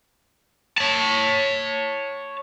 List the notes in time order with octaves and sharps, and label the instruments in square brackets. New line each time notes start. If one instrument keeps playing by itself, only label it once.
[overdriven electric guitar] C#5 A5